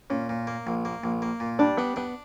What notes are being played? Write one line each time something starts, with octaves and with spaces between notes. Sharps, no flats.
A#2 C#4
A#2
A#3
A#1
A#3
A#1
A#3
A#2
G3 D4
B3 D4
B3 D4